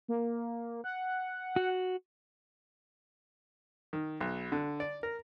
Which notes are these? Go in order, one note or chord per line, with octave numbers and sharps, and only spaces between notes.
A#3
F#5
F#4
D#3
B1
D3
D5
A#4